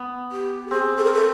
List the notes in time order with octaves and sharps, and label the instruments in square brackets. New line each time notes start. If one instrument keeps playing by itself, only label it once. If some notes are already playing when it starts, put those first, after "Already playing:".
Already playing: [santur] B3
[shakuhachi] G4
A4
[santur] C4 [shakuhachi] G#4
[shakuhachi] A4
A#4
A4